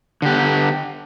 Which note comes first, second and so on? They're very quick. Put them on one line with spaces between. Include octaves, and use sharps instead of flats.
D3 G4 B3